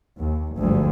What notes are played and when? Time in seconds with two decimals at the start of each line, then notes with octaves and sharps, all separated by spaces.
0.19 D#2
0.57 G1 D2 G#2 F3 G3